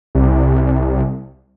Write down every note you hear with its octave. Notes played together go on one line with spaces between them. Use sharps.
C2